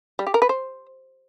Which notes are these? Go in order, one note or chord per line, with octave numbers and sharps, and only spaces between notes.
G3
G4
A#4
B4
C5